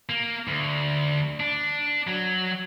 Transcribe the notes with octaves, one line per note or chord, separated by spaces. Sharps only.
A#3
D2
D4
F#3